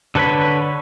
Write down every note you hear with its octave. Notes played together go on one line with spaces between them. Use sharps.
D3 A4 B4 C#5 B5